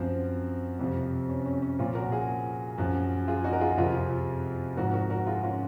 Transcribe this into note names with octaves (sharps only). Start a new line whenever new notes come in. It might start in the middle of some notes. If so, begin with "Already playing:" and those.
Already playing: F#2 F3 C4
F2 C3 F3
C#4
C#4
C#4
A#2 F3 C#4 F4
F#4 A#4
F4 G#4
F#2 F3
F4 G#4
D#4 F#4
A#4
F4 G#4
F2 C3 F3 F4 G#4
G#2 F3 F#4 A#4
F#4 A#4
F#4 A#4
F4 G#4
C#4 F4